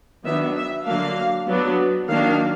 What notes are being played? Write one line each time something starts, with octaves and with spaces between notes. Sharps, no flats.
D#3 F#3 B3 D4 E5
E5
D3 F#3 A#3 D4 F5
F#3 B3 D4
D#3 F#3 A#3 D4 F5